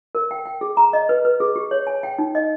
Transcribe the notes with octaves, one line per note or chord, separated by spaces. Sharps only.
A#4
G5
G5
G#4
A#5
D#5
B4
B4
G#4
G4
C#5
G#5
G5
D#4
D#5